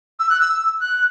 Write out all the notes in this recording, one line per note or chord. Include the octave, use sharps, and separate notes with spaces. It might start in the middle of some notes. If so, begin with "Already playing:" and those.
E6
F#6
E6
F#6